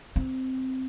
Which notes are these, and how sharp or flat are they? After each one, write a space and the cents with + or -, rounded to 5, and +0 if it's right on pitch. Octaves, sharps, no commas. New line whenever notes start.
C4 -5